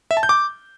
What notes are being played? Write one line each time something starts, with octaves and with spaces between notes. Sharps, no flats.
E5
A5
G6
D6